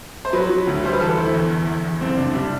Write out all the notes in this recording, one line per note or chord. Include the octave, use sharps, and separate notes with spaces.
C5
F#3 B4
F#3
D2
G3 C5
B4
E3 A4
B4
D2 C5
E4
E2
E2
E2
E2
F#1 C4
C3 D4
G3 D4